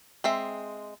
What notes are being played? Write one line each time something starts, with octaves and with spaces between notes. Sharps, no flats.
G#3 C4 E5